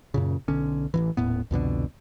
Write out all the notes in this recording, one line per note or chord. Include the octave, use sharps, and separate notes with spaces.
F#2 A#2 C#3
B1 D3 C#4
A1 A#2 E3
D#1 A2 B3
C2 F2 B2 D3